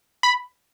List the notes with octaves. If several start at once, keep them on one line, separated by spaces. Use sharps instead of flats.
B5